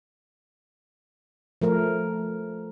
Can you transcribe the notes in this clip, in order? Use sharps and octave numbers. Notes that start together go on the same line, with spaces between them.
F3 A3 A#4